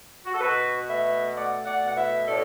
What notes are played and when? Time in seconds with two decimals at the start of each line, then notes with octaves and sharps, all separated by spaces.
0.24 F#4
0.32 A4
0.41 B2 F#4 B4
0.87 A3 B4 E5
1.34 A3 D5 F#5
1.64 D5 F#5
1.80 B2
1.86 F#5
1.95 B4 E5
2.26 A2 A4 D5